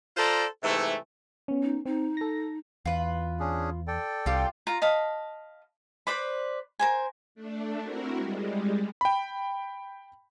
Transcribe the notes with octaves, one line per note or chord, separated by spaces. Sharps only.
F4 A4 C5 D5 A#5
G#2 C3 E3 A3
B3 C#4
D#4
C4 D#4
A4 A#6
E2 F4 B4
C#4 D4 G#4
A4 D5 G5
C2 G3 F4 G4
F4 A#5
D#5 F5 A5 B5
B4 C5 D5 B5
A#4 C5 G#5
A3 D4
C4 E4 F#4 A#4
G3 G#3
G5 B5